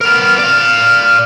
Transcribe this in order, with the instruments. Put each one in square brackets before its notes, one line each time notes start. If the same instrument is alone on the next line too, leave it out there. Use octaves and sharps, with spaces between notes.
[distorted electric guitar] B3 A#4 [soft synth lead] F6
[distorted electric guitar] D5 F5